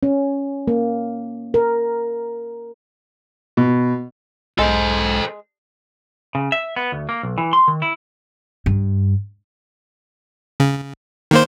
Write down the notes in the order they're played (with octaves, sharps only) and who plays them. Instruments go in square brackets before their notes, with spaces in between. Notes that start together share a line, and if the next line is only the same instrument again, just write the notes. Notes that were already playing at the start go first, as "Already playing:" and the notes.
[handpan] C#4
A#3
A#4
[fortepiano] B2
[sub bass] B1 [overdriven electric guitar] G#2 [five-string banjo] G#3 [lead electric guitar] A4 C5
[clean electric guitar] C#3
E5
B3
D2
A#3
B1
E3
C6
D#3
E4
[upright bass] G2
[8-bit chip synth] C#3
D#3 A#3 C5